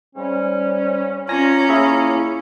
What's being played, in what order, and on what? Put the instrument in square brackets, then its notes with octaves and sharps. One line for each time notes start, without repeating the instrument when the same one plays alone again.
[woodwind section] G#2 G3 [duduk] C#4
[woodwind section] F#2 D5 A#5 [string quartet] C#4 [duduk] F4 [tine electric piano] G#5 A#6
[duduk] A#3 [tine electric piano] E4 G#4 E5